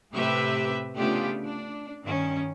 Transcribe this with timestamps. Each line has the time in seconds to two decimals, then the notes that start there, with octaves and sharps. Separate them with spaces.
0.14 A2 C3 A3 G4 B4 E5
0.98 C#3 A3 B3 D4 F4 G4
1.44 D4
2.04 G2 D#3 C#4